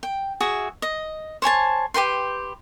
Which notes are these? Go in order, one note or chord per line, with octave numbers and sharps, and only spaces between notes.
G5
F#4 G#4 E5
D#5
C5 C#5 G#5 A5
G4 B4 G5 C6